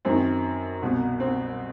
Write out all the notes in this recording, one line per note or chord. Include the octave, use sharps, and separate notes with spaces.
F#2 D#3 C4
C2 B2
C4